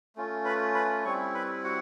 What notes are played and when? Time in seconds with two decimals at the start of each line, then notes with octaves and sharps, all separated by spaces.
0.16 A3 C#4 F4
0.45 B4 B5
0.75 B4 B5
1.05 G3 C4 E4 C#5 C#6
1.34 B4 B5
1.64 F#4 F#5